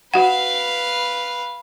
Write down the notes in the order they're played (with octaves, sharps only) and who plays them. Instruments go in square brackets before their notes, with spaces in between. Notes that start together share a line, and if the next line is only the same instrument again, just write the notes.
[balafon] F#4 F#5 [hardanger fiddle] B4 F5